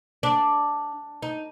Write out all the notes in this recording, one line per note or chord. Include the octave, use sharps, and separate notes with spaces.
D4
D#4